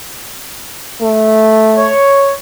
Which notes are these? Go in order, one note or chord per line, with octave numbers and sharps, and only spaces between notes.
A3
C#5